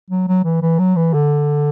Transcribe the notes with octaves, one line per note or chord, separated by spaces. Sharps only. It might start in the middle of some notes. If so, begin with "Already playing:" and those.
F#3
F#3
E3
E3
F#3
E3
D3